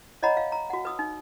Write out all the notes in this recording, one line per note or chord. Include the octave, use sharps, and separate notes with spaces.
C#5 D#5 F#5 A#5 B5
F5
A#5
F#4 F#5
B4 D#6 E6
D#4